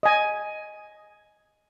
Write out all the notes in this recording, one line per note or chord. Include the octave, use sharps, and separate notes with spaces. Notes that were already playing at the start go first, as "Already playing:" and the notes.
D#5 G#5